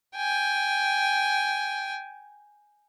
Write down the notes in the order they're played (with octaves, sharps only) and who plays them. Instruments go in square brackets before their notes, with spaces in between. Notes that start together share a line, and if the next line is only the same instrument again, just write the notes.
[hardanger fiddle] G5 G#5